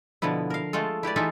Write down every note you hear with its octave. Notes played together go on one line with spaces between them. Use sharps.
B2 D3 F3 B3 E4
A#4 F5
G#3 A3 F4 A4
E4 G4 B4 D5
E3 D#4 F4 G#4 A4 E5